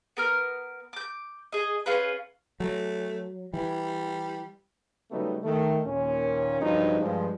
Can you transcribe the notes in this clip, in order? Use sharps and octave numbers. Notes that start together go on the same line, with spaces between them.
B3 A#4 F6
D6 G6
G#4 D#5
C#4 F4 G#4 B4
F#3 A3
E3 G3
C#3 F#3 G3 A3 B3 D#4
D#3 A3
D#2 A#2 C#4
G2 C#3 F3 F#3 D#4
G2 F3 G#3